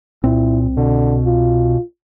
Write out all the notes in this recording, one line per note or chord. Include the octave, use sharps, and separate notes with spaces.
C2 A#2 C4 E4
B2 D3
F4